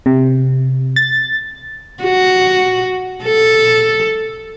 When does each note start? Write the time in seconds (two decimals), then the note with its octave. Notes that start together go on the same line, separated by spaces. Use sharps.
0.06 C3
0.96 A6
2.03 F#4
3.24 A4